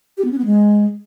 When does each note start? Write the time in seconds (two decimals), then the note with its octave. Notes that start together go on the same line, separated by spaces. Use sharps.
0.18 G4
0.24 B3
0.31 C#4
0.38 B3
0.45 G#3